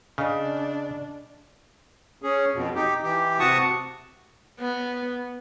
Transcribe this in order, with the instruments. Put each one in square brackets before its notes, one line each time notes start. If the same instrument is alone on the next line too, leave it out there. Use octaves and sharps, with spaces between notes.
[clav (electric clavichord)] C#3 [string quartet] D4 [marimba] D#5 F5 G#5
[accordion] C#4 G#4
F2 B2
D#4 G4
E3 G4
C3 F#4 A5 C#6 D#6
[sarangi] B3